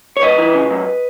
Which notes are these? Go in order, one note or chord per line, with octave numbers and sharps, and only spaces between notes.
C#5
F#2 B4 D#5
E3
C#3
F#2